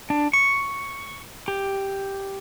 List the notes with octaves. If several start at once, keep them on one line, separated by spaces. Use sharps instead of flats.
D4
C#6
G4